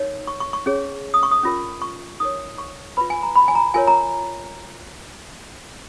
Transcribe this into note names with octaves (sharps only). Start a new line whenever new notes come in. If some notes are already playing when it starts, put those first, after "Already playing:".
Already playing: D#4 A#4 C#5
C#6
C#6
C#6
C#4 G#4 C#5
D#6
C#6
D#6
C#4 F4 A#4
C#6
D#4 A#4 C#5 D#6
C#6
F4 B4 B5
G#5
A#5
B5
G#5
A#5
F4 A#4 C#5 G#5
A#5